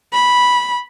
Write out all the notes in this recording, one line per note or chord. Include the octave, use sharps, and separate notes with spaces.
B5